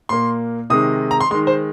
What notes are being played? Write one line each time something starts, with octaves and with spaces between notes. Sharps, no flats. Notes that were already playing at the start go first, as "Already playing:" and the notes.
A#2 A#3 C6
C3 D#3 G#3 D#6
A#5
C6
D#3 G#3 C6
C5